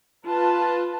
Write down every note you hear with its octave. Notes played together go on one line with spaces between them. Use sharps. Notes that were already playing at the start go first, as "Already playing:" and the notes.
F4 B4 A5